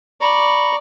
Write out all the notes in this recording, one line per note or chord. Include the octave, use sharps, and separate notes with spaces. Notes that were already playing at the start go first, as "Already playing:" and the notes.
D5 A#5 B5 C#6